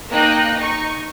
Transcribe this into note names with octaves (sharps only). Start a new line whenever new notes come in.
A#3 D#4 F5 G5 F#6
D#4 C#6